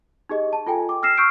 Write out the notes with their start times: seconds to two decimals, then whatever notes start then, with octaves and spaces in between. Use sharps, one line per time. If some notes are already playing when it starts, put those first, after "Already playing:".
0.29 D#4 G4 G#4 D#5
0.53 A5
0.67 F4 A4 G5 G#5
0.89 D6
1.03 E6 F6 A#6 C7 E7
1.17 C#6 E6 F6 G6 C7 D7